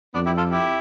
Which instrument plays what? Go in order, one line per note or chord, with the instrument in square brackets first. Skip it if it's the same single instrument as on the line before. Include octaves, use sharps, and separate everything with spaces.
[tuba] F2 [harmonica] B3 D4
[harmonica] E4 G4
F4 A4
E4 G4